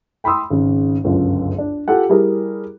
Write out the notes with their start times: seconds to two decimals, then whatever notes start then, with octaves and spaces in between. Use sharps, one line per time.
0.24 G5 B5 C6 D#6 E6
0.50 G#1 C#3
1.04 G1 C#2 F#2
1.58 D4
1.88 F4 G4 A4 F#5
2.09 G3 E4 G#4 A#4